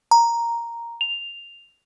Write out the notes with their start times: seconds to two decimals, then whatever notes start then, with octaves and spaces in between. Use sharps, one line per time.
0.11 A#5
1.01 F7